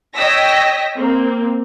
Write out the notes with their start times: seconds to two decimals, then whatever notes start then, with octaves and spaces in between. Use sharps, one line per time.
0.15 C#5 D#5 G5 E6 A#6 B6
0.95 A#3 C4